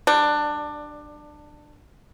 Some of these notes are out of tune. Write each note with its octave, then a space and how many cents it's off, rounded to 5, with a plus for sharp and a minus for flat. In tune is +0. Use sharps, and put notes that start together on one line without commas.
G3 +0 D4 +20